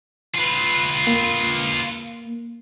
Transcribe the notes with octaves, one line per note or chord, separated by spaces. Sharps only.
F4 B4
A#3